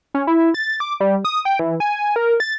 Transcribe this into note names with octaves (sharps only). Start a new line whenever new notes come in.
C#4
E4
A6
D6
G3
D#6
G5
E3
G#5
A#4
A6